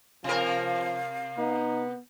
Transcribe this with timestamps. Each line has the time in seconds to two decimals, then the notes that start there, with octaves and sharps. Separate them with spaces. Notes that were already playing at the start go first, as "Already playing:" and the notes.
0.24 C3 F3 A#4 F5
1.38 B3 D#4